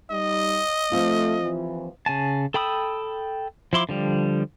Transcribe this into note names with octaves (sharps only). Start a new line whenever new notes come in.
G3 D#4 D#5
F3 A3 C4 F4
D#2 E3
C#3 G#5 A5
A4 G5 B5 D#6 E6
F3 E4 C6 D6
D3 F3 G3